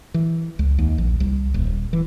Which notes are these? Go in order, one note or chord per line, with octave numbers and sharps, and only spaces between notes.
E3
C#2
D#2
A#1
C2
D#1
E3